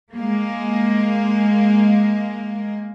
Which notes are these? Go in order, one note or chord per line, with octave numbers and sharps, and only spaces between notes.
G#3 A#3